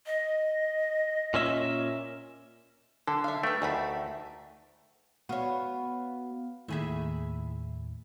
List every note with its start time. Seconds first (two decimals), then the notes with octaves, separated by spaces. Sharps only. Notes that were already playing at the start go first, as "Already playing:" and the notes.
0.06 D#5
1.34 A#2 C#4 E5
3.07 D3 A4
3.24 E5 F5
3.43 A3 B4 G5
3.62 D2 D#3 A3 B5
5.29 B3 F#4 C#5 F5
6.68 D#2 A2 E4 G#4 E5